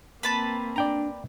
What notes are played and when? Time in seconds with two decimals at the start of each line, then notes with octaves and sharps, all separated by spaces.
0.23 A#3 C4 B4 A5 B5
0.76 D4 D5 G5 A#5